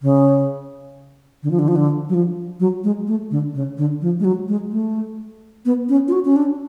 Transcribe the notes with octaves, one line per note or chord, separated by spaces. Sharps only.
C#3
D3
F3
D3
F3
D3
F#3
F3
F#3
G#3
A3
D3
C#3
D3
F3
G#3
F#3
G#3
A3
B3
C#4
F4
F#4
C#4
D4